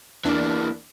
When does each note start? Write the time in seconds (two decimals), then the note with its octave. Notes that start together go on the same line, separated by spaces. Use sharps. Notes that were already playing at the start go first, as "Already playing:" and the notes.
0.25 E2 E3 A#3 D4